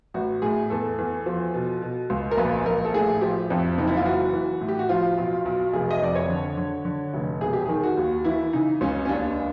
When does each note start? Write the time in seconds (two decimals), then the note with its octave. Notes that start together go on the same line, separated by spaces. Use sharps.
0.14 A1 F#4
0.42 A2 G#4
0.70 E2 A4
0.98 E2
1.26 F3
1.54 B2
1.82 B2
2.10 C#2
2.31 A#4
2.37 A#1 B4
2.66 A#1 A#4
2.84 A4
2.94 A2 G#4
3.21 F3 G4
3.50 F2
3.78 F#1 D#4
3.87 E4
3.97 F4
4.05 E3 F#4
4.33 E3
4.61 A2
4.68 G4
4.79 F#4
4.89 F3 F4
5.17 B1
5.46 B1
5.73 F1 G#4
5.91 D#5
6.02 F2 D5
6.15 C#5
6.30 D3
6.57 D3
6.85 D3
7.14 F1
7.41 E1 G#4
7.53 G4
7.65 D#3 G#4
7.83 F#4
7.97 D#2
8.24 E3 E4
8.53 C#3 D#4
8.81 C#2 C#4
9.05 C#4
9.09 D#2 D4